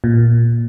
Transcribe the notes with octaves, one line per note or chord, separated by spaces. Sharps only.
A#2